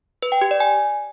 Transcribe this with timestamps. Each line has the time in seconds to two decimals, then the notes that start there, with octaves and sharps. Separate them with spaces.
0.22 B4
0.32 G5
0.41 G4
0.51 D5
0.60 G#5